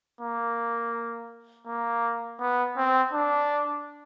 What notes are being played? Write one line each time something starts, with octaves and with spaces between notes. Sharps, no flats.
A#3
A#3
B3
C4
D4